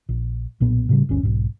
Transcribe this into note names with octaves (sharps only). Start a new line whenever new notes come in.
A#1
B1 A#2 B3
A2 C#3 G3
G1 D2 C#4
B1 G#2